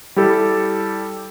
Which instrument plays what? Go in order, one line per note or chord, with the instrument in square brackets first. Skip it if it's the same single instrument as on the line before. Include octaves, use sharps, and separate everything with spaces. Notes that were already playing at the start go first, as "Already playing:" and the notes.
[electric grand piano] G3 E4 G4 A4